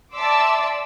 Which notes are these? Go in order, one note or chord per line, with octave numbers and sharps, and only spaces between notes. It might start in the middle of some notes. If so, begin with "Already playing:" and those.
D5 E5 A5 C6 D6 E6